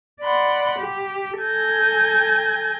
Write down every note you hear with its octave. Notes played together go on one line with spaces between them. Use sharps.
D5 D#5 F#5 B5 C6
G4
A4 G#5 G6 G#6 A#6